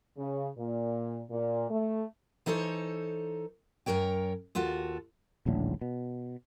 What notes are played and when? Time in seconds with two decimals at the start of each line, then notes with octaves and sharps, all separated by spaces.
0.17 C#3
0.57 A#2
1.30 A#2
1.70 A3
2.46 E3 D#4 A4 C5 C#5
3.86 F#2 C#3 A#4 C#5 G5
4.55 D#2 F4 F#4 A4
5.46 D#1 A#1 A2 D3
5.81 B2